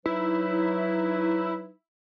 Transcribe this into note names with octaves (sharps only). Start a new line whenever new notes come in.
F#3 D#4 E4 B4